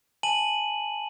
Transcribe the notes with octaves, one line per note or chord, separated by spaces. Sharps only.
G#5 A5 D#7 F#7